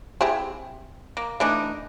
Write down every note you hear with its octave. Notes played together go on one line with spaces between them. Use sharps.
C4 E4 G4 G#4
A#3
E3 A3 D4 D#4